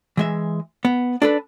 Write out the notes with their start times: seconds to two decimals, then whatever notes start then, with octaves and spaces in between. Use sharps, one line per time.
0.17 E3 G#3 E5
0.85 B3
1.22 D4 A4 B4